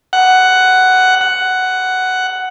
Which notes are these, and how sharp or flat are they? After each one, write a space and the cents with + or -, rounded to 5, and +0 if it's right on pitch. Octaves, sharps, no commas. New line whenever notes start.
F#5 +5
F#5 +5